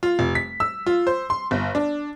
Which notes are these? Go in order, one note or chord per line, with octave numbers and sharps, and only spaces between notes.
F4
F1
B6
E6
F4
C5
C6
G1
D4